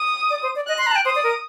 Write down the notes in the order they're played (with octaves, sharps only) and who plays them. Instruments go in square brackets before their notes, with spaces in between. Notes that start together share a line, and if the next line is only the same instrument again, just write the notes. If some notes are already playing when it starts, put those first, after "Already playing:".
Already playing: [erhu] D#6
[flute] D5
C5
D5
[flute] D#5 [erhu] F#6
[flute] C6
A#5
A5
G5
[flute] C5 [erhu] D#6
[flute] D5
A#4